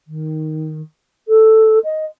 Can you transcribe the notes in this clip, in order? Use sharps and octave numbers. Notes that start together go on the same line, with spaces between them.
D#3
A4
D#5